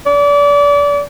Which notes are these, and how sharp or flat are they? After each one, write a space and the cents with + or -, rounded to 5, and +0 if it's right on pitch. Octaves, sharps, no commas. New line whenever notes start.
D5 -30